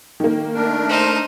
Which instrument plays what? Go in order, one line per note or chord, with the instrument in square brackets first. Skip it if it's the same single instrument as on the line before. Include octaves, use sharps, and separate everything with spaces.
[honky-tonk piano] D#3 A#3
[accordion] A3 D4 A#4
[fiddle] D#4 C5